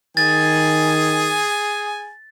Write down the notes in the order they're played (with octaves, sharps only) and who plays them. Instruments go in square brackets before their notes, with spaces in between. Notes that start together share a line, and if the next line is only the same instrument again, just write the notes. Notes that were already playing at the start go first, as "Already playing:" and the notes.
[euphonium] D#3 [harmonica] G#4 G#5 [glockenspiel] A6